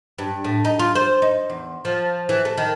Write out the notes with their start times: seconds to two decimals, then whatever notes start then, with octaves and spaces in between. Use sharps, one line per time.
0.18 G2
0.44 A2
0.65 D#4
0.79 F4
0.95 C5
1.22 D#4
1.50 E2
1.85 F3
2.29 E3
2.45 A3
2.57 D#3